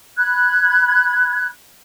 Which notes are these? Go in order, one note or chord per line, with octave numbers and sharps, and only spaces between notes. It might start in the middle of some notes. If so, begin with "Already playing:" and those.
B5 F#6 G#6